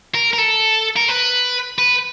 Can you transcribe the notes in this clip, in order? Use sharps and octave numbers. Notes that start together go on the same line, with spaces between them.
A#4
A#4
A4
A#4
B4
B4